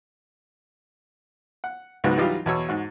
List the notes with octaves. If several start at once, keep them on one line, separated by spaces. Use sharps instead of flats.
F#5
C#2 G#2 F#3 B3 F#4
E3 F#3 G3 D#4 F4 G4
E2 B2 C#5 E6
G#2 F#4